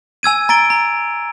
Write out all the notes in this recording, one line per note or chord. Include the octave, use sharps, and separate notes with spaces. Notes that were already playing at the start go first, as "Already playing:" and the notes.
G#5 E6 G#6 D#7
A#5 A6 D7 G7
A#5